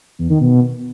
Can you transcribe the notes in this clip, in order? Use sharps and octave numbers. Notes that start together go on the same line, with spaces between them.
E2
D#3
B2